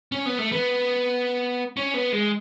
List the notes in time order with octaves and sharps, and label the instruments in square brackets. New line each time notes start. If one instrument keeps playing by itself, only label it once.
[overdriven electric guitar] C#4
B3
A3
B3
C#4
B3
G#3